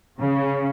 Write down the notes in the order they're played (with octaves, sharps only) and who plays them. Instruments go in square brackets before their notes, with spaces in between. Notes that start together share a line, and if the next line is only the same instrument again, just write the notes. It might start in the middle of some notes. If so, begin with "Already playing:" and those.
[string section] C#3